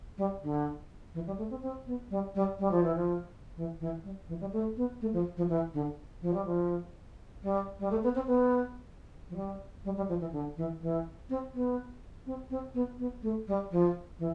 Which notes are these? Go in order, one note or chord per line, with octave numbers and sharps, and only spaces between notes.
G3
D3
E3
G3
A3
C4
C4
B3
G3
G3
G3
F3
E3
F3
E3
E3
G3
E3
G3
A3
B3
A3
F3
F3
E3
D3
F3
G3
F3
G3
G3
A3
B3
C4
B3
F3
G3
G3
G3
F3
E3
D3
E3
E3
C4
B3
C4
C4
B3
B3
A3
G3
F3
E3